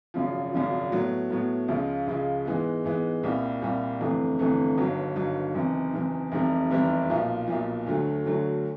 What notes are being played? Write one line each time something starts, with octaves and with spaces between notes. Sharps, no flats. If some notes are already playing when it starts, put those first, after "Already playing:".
G#1 F#2 C#3 F3
G#1 F#2 C#3 F3
A2 F#3 B3
A2 F#3 B3
C#2 C#3 F3 G#3
C#2 C#3 F3 G#3
G#2 E3 G#3 B3
G#2 E3 G#3 B3
C2 A#2 G3
C2 A#2 G3
G1 F2 C3 E3 A3
G1 F2 C3 E3 A3
G1 G2 D#3 F#3
G1 G2 D#3 F#3
F#1 E2 C3 D#3
F#1 E2 C3 D#3
F1 E2 C3 D#3 G3
F1 E2 C3 D#3 G3
B1 A#2 F3
B1 A#2 F3
D2 D3 F#3 A3
D2 D3 F#3 A3